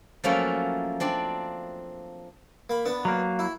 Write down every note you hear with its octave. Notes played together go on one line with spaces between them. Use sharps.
F3 F#3 A3 A#3 C#4 E4
C4 D4 D5 C6
A#3 B5
B3 D4
F#3 A#3
E4